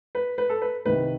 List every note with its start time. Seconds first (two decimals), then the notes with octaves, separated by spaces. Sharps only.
0.15 B4
0.38 B4
0.49 A4
0.62 B4
0.85 C2 C3 D#3 B4